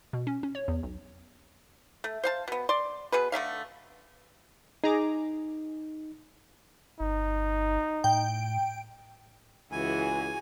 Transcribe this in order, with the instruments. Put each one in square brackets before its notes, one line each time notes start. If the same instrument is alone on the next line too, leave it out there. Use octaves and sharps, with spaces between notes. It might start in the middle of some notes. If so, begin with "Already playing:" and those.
[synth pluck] B2
C#4
C#4
C#5
E2
B1
[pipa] A3
C5 F5 A5
B2 B3
D5 C6
B2 G#4 B4
D3 A3 E5 F5
[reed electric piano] D#4 [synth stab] G#4 A#5 D6
[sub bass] G1 [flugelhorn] D#4
[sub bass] A2 [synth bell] G5
[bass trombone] C#2 [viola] E3 [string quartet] F#4 G#4 [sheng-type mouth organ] G#5